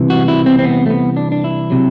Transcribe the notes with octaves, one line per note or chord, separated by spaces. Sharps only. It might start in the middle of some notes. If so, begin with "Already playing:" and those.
Already playing: C2 C3 E3
F#4
E4
C4
C4
B3
A3
B3
D4
D4
E4
C3 F#3